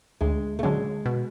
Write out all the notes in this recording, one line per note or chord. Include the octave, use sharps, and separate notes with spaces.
D2 G#3
A3
D3 F#3 G#3 C#4
B2